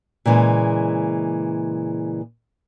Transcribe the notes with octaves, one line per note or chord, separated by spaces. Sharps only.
A#2 C#3 E3 G#3